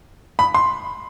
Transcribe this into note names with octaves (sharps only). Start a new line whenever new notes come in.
B5
C6